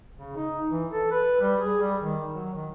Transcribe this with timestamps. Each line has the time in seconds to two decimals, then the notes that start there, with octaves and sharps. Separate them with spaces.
0.18 C#3
0.36 D#4
0.69 E3
0.92 A4
1.11 B4
1.41 G3
1.60 G#4
1.80 G3
2.00 D#3
2.33 F#3
2.54 D#3